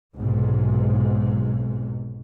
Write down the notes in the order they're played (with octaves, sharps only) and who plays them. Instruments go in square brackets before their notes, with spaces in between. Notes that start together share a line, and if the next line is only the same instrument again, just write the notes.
[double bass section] B1 G#2 C3